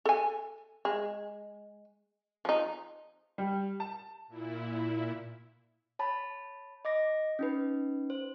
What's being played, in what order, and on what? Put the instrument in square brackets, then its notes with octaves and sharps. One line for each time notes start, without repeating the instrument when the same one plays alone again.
[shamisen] A4 G#5
G#3
F3 D#4
[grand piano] G3
A5
[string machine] A#2 E4
[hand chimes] C#5 A5 B5
D#5 D6 A#6
C#4 D#4 B4
C5